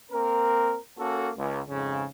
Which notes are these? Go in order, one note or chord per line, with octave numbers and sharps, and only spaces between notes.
A#3 C4 A#4
A#3 C#4 F#4 A4
C#2
F2 G#2 C#3